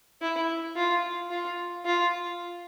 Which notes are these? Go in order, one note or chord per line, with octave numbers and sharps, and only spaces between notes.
E4
F4
F4
F4